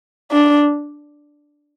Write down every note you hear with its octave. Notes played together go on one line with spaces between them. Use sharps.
D4